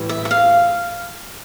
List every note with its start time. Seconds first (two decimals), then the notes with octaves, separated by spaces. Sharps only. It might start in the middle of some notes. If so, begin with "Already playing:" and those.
Already playing: A2 E3 G3
0.09 E5
0.25 E5
0.31 F5